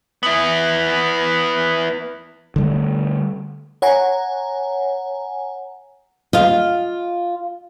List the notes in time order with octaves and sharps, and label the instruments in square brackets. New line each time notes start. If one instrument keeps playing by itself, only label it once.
[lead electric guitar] B3 E4
[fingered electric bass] D3 G3 A3
[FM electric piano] C#5 F#5 G#5 A#5
[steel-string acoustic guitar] F4 [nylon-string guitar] D#5 F5